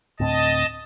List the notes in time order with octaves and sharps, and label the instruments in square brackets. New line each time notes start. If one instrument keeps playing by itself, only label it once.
[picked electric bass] D2 A2 C4 [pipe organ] D#5 A5